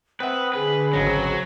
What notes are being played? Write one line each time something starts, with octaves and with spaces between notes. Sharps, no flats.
C4 B4 E5 F#5 D#6
D3 G#4 B4
G#1 C#2 C#3 F#3 C5